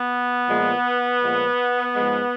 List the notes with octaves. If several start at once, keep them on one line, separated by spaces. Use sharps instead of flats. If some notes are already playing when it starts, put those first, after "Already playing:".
Already playing: B3
A#2 F3 G#3
A#2 F3 G#3
G#2 F3 G#3